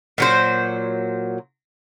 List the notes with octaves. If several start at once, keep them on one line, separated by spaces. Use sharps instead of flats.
A#2 F#3 C5